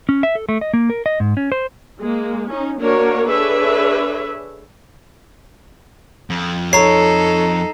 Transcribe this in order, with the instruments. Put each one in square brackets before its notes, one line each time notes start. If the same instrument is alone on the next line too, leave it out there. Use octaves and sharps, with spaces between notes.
[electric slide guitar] C#4
E5
A4
A3
D#5
A#3
A#4
D#5
G#2
C#4
C5
[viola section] G#3 A#3
C#4 D#4
A#3 D4 F#4 A#4 C#5
D4 G#4 A4 B4 C#5 E5
[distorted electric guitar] F2
[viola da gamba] D#4 A4 [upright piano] C#5 [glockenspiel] A#5 C7